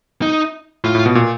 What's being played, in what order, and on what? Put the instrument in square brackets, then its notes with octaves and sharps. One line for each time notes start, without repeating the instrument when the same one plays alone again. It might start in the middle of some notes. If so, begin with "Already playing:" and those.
[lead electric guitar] D#4
[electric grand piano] A2 [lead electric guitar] F4
[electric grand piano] A2
B2
A#2